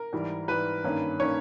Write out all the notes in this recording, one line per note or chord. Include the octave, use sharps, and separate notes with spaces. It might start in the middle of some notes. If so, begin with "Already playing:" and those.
Already playing: A#4
G#2 E3 G3
G#2 E3 G3 B4
G2 D#3 A#3 C#4
D#3 A#3 C#4 C#5